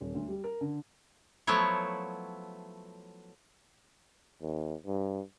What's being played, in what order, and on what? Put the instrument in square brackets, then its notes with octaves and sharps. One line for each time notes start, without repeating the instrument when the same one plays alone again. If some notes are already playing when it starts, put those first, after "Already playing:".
[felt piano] D#1
D2
G3
A#4
D3
[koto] F3 F#3 A3 B3 E4 C#5
[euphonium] D#2
G2